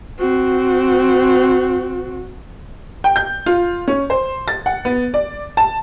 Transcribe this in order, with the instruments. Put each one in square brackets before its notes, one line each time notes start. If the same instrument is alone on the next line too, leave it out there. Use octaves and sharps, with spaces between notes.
[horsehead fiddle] C4 F#4
[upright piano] G5
G6
F4
C#4
C5
A6
F#5
B3
D5
A5